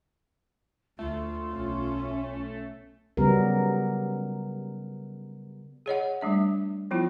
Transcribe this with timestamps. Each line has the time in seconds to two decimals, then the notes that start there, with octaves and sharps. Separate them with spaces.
0.99 D2 A3 F4
1.52 B1 C#4
3.17 C#3 F#3 G3 B3 A#4
5.86 G#4 C#5 D#5 F#5
6.21 G3 A3 D4 E5
6.91 F3 F#3 B3 E4 F4